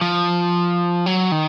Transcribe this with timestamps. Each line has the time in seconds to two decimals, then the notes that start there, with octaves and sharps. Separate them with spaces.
0.01 F3
1.06 F#3
1.32 D#3